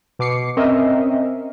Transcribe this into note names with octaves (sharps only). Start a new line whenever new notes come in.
B2 D6 C7 C#7
C4 C#4 A#4 D#5 E5